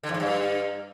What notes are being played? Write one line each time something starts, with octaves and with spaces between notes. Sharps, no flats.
D3
E2
G#2
G2